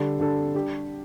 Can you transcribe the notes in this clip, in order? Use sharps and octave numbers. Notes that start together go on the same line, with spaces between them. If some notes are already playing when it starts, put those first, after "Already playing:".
Already playing: D3 G3 D4 A4
D3 G3 D4 A4
G3 D4 G4